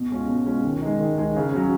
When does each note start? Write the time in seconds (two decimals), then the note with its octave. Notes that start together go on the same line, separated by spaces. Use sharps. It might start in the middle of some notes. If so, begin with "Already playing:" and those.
Already playing: B2
0.11 G#3 C#4 F4
0.28 B2
0.46 G#3 C#4 F4
0.64 D#3
0.82 G#3 D#4
1.00 D#3
1.18 G#3 D#4
1.36 C#3
1.53 F#3 C#4